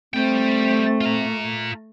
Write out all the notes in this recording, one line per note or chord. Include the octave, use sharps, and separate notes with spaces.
G3 A3 C4 G5
F4 A#5